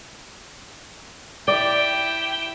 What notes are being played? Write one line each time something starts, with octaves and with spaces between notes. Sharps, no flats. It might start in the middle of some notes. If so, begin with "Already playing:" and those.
E4 G4 D5 G5